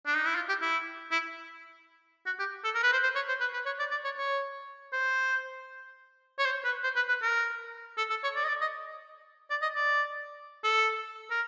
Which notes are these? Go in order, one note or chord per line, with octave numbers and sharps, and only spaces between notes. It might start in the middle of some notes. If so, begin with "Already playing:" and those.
D4
D#4
E4
F4
G4
E4
E4
F#4
G4
A4
A#4
B4
C5
C5
C#5
C5
B4
B4
C#5
D5
D5
C#5
C#5
C5
C#5
C5
B4
C5
B4
B4
A#4
A4
A4
C#5
D5
D#5
D5
D#5
D5
D#5
D5
A4
A#4